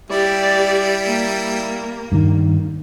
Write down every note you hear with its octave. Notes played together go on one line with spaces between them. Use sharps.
G3 E4 G4 D5
A#3
G2 D#3